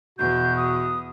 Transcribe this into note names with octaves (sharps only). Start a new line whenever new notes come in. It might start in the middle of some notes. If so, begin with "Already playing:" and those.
E2 B2 F#4 G6
D#6